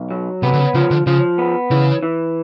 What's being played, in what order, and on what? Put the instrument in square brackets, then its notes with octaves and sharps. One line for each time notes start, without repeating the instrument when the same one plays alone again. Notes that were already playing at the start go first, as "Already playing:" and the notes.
Already playing: [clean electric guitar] B1
F#3
[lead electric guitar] C3 [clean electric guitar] B3
[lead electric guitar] D3
C#3
[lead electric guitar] C#3 [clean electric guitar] F3
[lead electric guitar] D3
[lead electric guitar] C#3 [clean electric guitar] F3
[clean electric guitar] B3
[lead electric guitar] C#3 [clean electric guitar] E3
[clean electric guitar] E3